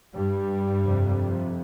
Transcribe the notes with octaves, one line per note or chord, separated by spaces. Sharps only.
G2 G3
F2 C3